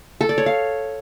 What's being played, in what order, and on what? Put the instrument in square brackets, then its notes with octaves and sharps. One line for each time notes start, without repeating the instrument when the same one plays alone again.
[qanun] A4
D5
C#5
F5